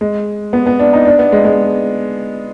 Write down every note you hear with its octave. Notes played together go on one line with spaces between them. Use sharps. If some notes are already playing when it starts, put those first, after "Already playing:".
G#3
B3
B3
D4
D#4
D4
B3
G#3
G#3